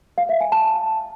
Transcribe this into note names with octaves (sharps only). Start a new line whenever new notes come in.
F5
E5
G#5
A5